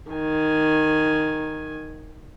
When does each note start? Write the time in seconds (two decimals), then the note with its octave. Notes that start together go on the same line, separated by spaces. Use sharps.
0.11 D#3 G#5